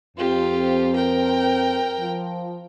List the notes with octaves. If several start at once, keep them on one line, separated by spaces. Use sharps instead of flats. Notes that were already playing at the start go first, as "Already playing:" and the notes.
F2 C4 F4 G4
A#4 G5
F3